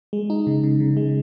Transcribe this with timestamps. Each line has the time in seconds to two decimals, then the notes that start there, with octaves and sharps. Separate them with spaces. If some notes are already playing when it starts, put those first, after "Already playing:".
0.13 G#3
0.30 D#4
0.47 C#3
0.64 C#3
0.80 C#3
0.97 G#3